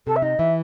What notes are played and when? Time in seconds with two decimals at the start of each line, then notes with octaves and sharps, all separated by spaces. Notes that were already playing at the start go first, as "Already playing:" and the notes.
0.07 C3 A4
0.16 E5
0.22 D#4 D#5
0.39 E3 E5